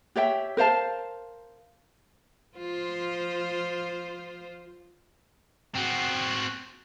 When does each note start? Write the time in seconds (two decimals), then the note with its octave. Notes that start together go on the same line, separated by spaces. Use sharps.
0.16 G4 C#5 E5 G5
0.57 A#4 C5 F5 A5
2.57 F3 F4 C5
5.76 C4 F#4